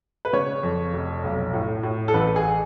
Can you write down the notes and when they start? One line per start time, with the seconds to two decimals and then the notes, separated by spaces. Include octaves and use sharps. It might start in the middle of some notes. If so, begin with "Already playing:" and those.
0.25 B4
0.33 C#3 C#5
0.63 F2
0.93 F1
1.23 B1
1.53 A2
1.83 A2
2.08 A4
2.13 A1 B4
2.36 G#4